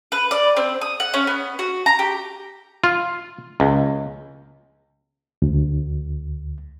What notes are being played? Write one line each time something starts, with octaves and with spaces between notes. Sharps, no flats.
B4
D5
C4
D#6
F#5
C#4
B3
F#4
A#5
G4
F4
C#2
D2